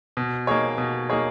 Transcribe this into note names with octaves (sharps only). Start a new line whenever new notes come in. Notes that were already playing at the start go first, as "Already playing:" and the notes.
B2
A#3 D#4 G#4 C#5
B2
A#3 D#4 G#4 C#5